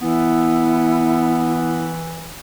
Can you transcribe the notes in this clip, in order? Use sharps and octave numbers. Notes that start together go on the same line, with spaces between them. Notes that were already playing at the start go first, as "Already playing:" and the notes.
E3 B3 E4